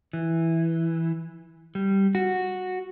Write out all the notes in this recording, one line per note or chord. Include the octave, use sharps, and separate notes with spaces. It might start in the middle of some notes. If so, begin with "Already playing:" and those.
E3
G3
F#4